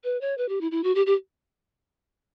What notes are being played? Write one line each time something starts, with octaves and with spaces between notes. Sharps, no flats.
B4
C#5
B4
G4
E4
E4
F#4
G4
G4